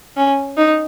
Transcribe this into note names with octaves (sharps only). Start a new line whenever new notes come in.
C#4
D#4